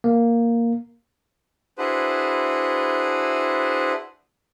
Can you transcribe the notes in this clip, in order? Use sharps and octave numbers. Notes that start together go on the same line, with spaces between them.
A#3
D4 E4 F#4 G#4 B4 C5